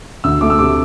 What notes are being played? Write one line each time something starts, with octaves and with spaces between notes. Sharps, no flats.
D2 E6
A3 D6
E6
C3 D6